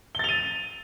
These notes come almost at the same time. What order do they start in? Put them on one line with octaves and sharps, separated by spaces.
G7 A6 F7 D#7